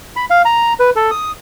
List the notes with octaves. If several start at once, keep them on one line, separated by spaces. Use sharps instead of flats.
B5
F5
A#5
B4
A4
D#6